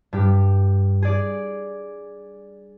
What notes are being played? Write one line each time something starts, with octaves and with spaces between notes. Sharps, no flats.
G2 G4
G#4 D5